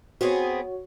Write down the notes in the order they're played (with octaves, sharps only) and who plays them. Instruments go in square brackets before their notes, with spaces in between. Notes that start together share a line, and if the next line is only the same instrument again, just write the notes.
[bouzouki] B3 C4 G#4 [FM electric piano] F#4 C#5